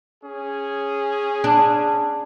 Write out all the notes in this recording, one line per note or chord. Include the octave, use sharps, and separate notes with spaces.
C#4 G#4
D4